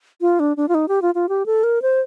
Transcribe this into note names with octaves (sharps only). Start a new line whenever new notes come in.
F4
D4
D4
F4
D#4
G4
F4
F4
G4
A4
A#4
C5